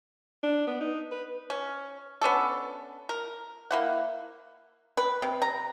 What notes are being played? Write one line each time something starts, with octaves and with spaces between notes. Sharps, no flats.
D4
B3
D#4
B4
C#4
B3 C#4 D4 A4
A#4
A#3 E4 F#5
B4
C3
A#5